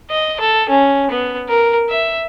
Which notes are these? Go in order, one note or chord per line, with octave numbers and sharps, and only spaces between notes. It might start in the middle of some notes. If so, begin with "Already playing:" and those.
D#5
A4
C#4
B3
A#4
E5